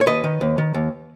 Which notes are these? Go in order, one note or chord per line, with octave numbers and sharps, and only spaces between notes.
C#5
D#2 B4 D#5
D#3
D#2
D#3
D#2